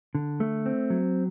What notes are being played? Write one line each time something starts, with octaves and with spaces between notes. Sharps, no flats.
D3
A3
C4
F#3